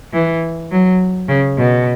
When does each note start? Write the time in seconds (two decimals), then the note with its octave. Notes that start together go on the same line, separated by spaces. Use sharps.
0.13 E3
0.72 F#3
1.29 C#3
1.58 B2